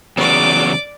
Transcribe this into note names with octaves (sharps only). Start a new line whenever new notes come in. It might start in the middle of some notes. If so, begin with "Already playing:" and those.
E2 C#3 F#3 D5 D6